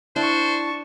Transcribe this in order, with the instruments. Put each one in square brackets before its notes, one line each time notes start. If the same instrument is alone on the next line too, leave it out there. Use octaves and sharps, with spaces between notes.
[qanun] D4 [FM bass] E4 [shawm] C5 [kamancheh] A5 C#6